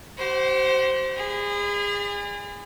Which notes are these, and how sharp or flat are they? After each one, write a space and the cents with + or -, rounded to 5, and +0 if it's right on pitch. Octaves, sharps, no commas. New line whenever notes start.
G4 -45 C5 +0 F#5 +10
G#4 -30 D5 +30 B5 +35